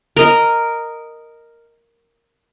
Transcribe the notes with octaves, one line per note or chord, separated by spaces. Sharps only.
A#4 D#5